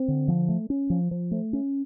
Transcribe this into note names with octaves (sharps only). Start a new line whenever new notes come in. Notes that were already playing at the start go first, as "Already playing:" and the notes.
Already playing: C4
D3
F3
A3
C#4
F3
F3
A3
C#4